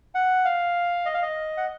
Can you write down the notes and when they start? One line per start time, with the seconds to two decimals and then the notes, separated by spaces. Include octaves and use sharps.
0.15 F#5
0.45 F5
1.05 D#5
1.14 F5
1.22 D#5
1.57 F#5